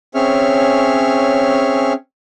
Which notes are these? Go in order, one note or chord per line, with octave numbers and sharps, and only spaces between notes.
C4 C#4 G#4 C#5 E5 F6